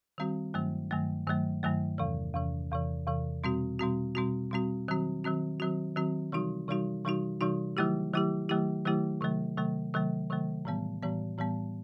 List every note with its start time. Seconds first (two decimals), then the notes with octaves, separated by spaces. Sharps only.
0.18 D#3 G3 C4 F#4
0.54 G2 D#3 F#3 A3
0.91 G2 D#3 F#3 A3
1.27 G2 D#3 F#3 A3
1.63 G2 D#3 F#3 A3
1.98 E2 C3 E3
2.35 E2 C3 E3
2.71 E2 C3 E3
3.07 E2 C3 E3
3.44 B2 G3 C4 F#4
3.79 B2 G3 C4 F#4
4.15 B2 G3 C4 F#4
4.51 B2 G3 C4 F#4
4.88 D#3 F#3 C4 F#4
5.24 D#3 F#3 C4 F#4
5.60 D#3 F#3 C4 F#4
5.96 D#3 F#3 C4 F#4
6.32 C3 E3 G3 D#4 F#4
6.68 C3 E3 G3 D#4 F#4
7.04 C3 E3 G3 D#4 F#4
7.41 C3 E3 G3 D#4 F#4
7.77 D#3 F#3 A3 E4 G4
8.14 D#3 F#3 A3 E4 G4
8.49 D#3 F#3 A3 E4 G4
8.85 D#3 F#3 A3 E4 G4
9.21 C3 D#3 F#3 A3
9.57 C3 D#3 F#3 A3
9.94 C3 D#3 F#3 A3
10.30 C3 D#3 F#3 A3
10.65 A2 E3 G3 B3
11.03 A2 E3 G3 B3
11.38 A2 E3 G3 B3